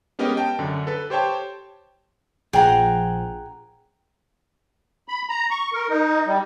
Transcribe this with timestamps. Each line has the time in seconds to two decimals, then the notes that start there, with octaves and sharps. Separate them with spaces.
0.19 G#3 B3 C#4 G4 A#4 D#5
0.37 G5 A5
0.59 F#2 D3
0.87 A4 B4
1.10 G4 C5 C#5 G5 A5
2.53 A#1 A#2 F3 G#4 F#5 G5 A#5
5.08 B5
5.29 A#5
5.51 C#6
5.73 A#4
5.90 D#4
6.26 G3